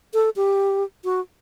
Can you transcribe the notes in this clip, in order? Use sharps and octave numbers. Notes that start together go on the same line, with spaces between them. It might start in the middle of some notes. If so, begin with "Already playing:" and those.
A4
G4
F#4